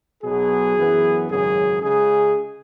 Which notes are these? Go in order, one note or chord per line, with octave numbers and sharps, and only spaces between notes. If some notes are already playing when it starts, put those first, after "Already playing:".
B1 B2 F#3 G#4
F#2 E3 B3
G#1 F#2 C#3 F#3 G#4
C#2 C#3 G#3 G#4